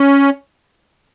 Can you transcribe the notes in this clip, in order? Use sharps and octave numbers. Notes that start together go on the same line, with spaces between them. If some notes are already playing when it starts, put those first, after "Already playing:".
Already playing: C#4